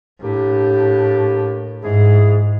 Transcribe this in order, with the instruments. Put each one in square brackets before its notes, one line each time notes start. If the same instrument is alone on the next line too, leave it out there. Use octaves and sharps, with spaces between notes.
[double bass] A2 [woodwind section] A#3 D4 G4
[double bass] G#2 [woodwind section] E4 G#4